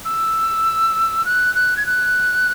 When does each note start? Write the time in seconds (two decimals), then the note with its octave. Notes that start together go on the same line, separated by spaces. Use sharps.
0.05 E6
1.26 F#6
1.55 F#6
1.77 G#6
1.86 F#6